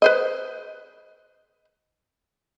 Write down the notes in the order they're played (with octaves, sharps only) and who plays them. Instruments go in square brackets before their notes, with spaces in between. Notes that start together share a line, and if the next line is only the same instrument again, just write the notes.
[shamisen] B4 C5 D#5